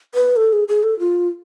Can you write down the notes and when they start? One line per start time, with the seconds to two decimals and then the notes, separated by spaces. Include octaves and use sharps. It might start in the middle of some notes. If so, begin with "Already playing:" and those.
0.15 B4
0.36 A4
0.53 G#4
0.68 G#4
0.83 A4
0.99 F4